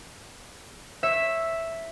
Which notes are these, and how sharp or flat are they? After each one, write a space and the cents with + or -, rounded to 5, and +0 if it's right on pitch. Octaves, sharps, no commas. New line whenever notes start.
C#5 -25 E5 +0